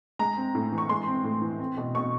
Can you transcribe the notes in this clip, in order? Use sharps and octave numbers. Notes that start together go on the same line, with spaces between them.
G#3 A#5
C4
A2
E3
C#6
G#3 C6
C4
A2
E3
C4
B2
B2 C#6